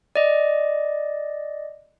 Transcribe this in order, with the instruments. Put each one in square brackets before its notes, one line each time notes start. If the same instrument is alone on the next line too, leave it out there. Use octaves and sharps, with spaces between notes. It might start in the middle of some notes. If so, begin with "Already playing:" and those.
[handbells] D5 D#5